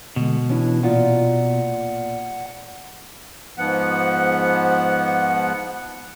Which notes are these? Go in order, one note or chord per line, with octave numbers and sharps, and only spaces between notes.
B2 D3 G#3
E3 C#4 D4 E4
A#2 F4 F#5
G#2 F3 B3 F#5